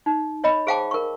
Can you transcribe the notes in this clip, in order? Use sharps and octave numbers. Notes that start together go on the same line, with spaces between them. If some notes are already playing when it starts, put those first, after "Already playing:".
D#4
C#5 D#5 B5
G#4 C5 F5 G5 A5 D6
A#4 C#6